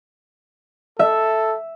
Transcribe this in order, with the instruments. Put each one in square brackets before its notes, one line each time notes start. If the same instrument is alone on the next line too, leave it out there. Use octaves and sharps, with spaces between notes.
[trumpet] A4 [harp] E5